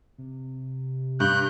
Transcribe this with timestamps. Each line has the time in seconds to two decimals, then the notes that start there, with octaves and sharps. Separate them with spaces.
0.18 C3
1.20 G2 F#6 G6